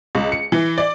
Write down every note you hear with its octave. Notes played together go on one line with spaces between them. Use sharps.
C#2
C#7
E3
D5